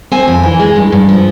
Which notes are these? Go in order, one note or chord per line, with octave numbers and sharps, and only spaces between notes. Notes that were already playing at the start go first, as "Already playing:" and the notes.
C4 G#5
F2
E3
G#3
G2
G2
F3